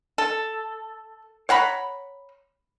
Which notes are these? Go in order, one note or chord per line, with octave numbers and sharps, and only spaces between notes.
A4
C#5 F#5 A#5 B5